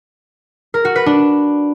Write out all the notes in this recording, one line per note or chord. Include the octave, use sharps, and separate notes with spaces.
A#4
F#4
B4
D4